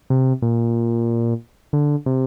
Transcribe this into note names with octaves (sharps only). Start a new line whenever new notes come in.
C3
A#2
D3
C3